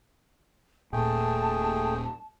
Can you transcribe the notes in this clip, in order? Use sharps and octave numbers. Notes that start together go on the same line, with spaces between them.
D#1 A#2 A3 G#4 G5 A5